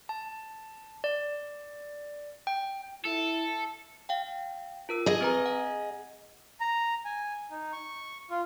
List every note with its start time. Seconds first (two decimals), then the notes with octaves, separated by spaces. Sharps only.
0.09 A5
1.04 D5
2.47 G5
3.05 E4 A4
4.09 F5 G5
4.89 F4 A#4 E6
5.06 G#4 D#5
5.21 C4 B4 A#5
5.46 F#5
6.60 A#5
7.05 G#5
7.51 D#4
7.72 C#6
8.30 F4